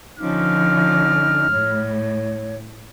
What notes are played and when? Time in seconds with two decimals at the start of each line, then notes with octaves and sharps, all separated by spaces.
0.18 D3 F3 C#4 D#4 D6 F6
1.50 A2 C#5